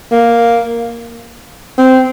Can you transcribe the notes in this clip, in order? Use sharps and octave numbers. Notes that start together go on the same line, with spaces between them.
A#3
C4